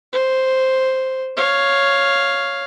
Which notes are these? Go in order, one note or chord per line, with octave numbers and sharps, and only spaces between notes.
C5
C#5 F5